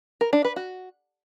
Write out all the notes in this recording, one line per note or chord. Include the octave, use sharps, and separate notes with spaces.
A#4
D4
B4
F#4